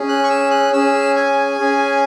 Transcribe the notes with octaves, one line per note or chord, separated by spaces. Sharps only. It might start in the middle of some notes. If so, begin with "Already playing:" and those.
Already playing: C#4 G#4
F#6
C#6
E6
F#6
C#4 G#4 E6
G#5
C#4 G#4